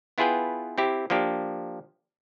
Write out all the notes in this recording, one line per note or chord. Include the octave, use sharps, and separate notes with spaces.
B3 E4 F4 G#4 B4 G5
C4 E4 G4
F3 A#3 D4 G4